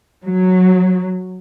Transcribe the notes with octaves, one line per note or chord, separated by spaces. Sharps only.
F#3